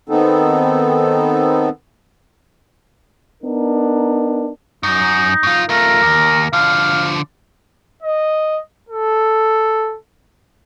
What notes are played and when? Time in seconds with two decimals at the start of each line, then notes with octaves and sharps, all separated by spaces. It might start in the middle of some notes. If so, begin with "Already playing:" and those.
0.09 D#3 B3 C4 D#4 A4
3.43 B3 D4 D#4 A#4
4.83 F#2 D#4
5.43 F#2 F4
5.70 A3 F4 A#4
6.03 D#2
6.53 D3 F3 F5
8.02 D#5
8.89 A4